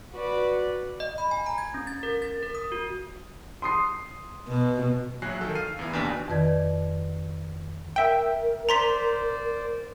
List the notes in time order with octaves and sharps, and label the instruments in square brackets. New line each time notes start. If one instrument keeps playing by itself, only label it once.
[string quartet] F#4 B4 D5
[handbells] D#5
B5
G#5
A#5
G#6
C#4
A6
A#4
A6
A#4
D#6
F#4
[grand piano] C6 D#6 C7
[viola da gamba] B2
[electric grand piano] A#1 F#3 F#4 G#5 F#6 C7
D#3 A4
F5 F6 C7 D#7
E2 E3
D#2 B2 D4 D5 G#5 B6
[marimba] F2 D#3 B4 D5 G#6
[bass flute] A#4 [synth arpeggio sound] E5 G5
[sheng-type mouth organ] C5 D5 [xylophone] A#5 C6 B6